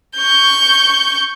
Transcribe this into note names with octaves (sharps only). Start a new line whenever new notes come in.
C#6 G6